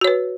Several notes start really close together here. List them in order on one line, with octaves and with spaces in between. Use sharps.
F#4 C#5 B4